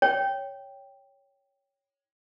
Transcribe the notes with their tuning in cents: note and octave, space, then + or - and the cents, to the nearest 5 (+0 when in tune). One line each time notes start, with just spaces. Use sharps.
C#5 +5 G5 +0